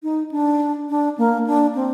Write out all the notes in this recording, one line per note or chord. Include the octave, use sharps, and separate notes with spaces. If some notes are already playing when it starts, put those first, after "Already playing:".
D#4
D4
D4
A#3
D4
C4